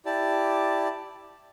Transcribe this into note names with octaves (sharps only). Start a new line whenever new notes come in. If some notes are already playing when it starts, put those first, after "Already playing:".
E4 G4 D5 A5